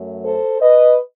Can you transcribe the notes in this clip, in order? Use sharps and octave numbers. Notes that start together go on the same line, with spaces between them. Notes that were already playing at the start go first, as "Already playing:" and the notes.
Already playing: F#2 F#3 A3
A4 C5
B4 D#5